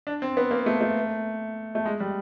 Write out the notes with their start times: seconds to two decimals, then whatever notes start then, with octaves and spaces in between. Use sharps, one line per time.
0.07 D4
0.22 C4
0.37 B3
0.51 A#3
0.66 A3
0.81 A3
1.75 A3
1.86 G#3
2.00 G3